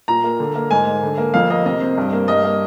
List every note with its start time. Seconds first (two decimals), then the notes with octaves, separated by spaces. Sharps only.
0.08 A#2 A#5
0.24 A#3
0.40 D3
0.56 A#3
0.71 G#2 G#5
0.87 G#3
1.03 D3
1.18 A#3
1.34 F2 F5
1.50 A#3 D#5
1.66 C3 D#5
1.82 C4
1.98 G2
2.13 A#3
2.28 G2 D#5
2.44 A#3